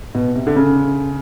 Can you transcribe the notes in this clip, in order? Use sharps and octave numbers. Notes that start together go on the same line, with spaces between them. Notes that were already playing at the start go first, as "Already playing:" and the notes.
B2
C3
D3
C#3